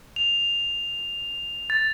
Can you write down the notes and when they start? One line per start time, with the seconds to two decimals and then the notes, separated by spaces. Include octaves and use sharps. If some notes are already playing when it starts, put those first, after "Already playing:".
0.16 F7
1.70 A6